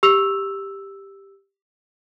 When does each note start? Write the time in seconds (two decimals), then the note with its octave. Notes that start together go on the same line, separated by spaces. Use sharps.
0.03 G4 E6 F7